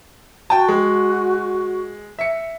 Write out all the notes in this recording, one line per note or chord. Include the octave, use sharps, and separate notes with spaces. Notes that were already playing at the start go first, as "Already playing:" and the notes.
F#4 G5 A5
G#3
E5 C#7